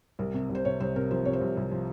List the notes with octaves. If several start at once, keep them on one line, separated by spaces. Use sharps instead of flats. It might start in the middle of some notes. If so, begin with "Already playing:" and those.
C2 A#4
C3
C2
C5
C3 C#5
C2 C5
C3 A#4
F3 C5
C3 C#5
C5
C2
C2
F3